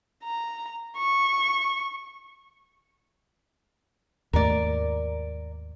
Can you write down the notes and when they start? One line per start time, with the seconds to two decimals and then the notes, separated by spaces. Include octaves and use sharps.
0.24 A#5
0.98 C#6
4.33 D#2 G#2 A3 A#4 D5